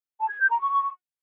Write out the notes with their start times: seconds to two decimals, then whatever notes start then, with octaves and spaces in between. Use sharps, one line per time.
0.20 A5
0.30 G#6
0.40 G6
0.50 A#5
0.60 C#6